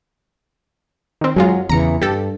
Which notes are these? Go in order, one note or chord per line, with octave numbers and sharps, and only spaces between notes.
D#3 C4
F#2 F#3 G#3 F4
E2 C#3 E3 A#5 C#7
G2 G4 A4